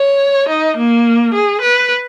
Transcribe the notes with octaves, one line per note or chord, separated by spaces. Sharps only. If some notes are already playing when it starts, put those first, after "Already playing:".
Already playing: C#5
D#4
A#3
G#4
B4